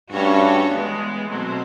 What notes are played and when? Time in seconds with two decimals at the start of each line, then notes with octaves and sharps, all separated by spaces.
0.12 G2 A3 C#4 F#4 A4 C#5
0.71 E3 G#3 B3
1.29 B2 F#3 A3 C4